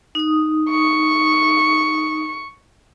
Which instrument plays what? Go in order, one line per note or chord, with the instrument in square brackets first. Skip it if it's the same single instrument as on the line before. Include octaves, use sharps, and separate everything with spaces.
[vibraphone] D#4 D#6
[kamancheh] C#6